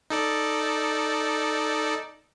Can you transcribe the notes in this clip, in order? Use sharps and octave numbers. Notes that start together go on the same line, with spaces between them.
D#4 A4 D5